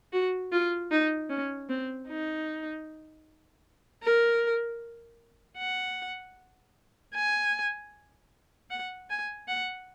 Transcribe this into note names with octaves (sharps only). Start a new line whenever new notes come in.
F#4
F4
D#4
C#4
C4
D#4
A#4
F#5
G#5
F#5
G#5
F#5